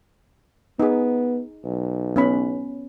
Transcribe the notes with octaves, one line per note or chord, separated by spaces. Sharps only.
B3 D#4 G#4
B1
B3 C#4 B5